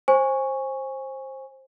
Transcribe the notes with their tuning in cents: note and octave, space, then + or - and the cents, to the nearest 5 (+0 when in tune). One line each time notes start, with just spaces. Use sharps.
C5 +20 G#5 -15 C#6 +0